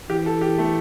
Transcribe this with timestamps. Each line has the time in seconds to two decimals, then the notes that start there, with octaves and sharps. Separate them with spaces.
0.09 E3 G4
0.26 A4
0.41 G4
0.58 A3